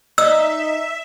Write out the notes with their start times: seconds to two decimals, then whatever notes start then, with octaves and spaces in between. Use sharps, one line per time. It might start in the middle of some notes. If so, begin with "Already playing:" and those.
0.18 D#4 E5 E6